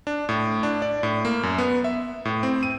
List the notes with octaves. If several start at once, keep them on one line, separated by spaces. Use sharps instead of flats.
D4
A2
D4
D5
A2
A#3
F#2
B3
E5
A2
C4
D#7